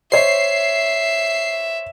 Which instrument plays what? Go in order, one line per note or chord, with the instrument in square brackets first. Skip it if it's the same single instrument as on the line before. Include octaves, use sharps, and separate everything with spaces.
[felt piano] C5 C#5 [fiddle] E5 [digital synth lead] C7